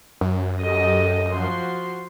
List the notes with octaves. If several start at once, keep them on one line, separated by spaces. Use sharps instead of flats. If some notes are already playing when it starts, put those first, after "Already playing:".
F#2
G4 A4 D#5
F3 F#4 C6